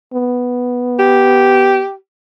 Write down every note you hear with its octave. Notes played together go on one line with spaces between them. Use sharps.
B3
G4